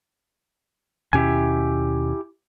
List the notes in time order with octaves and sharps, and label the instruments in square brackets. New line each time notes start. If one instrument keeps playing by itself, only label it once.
[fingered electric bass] D#2 B2 C#4 [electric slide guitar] E4 G4 G#5